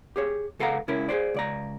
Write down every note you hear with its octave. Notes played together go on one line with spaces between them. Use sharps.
G4 G#4 C#5
C#2 A4 F5 F#5 A#5
C#2 C#4 E4 A#4
G#4 B4 C5 D5
C#2 D5 A#5